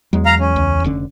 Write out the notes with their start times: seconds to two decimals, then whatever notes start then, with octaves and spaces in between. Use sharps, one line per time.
0.13 E2 F#3 G#3
0.26 F5 A#5
0.40 C#4
0.56 C#2
0.84 F1 D3 C#4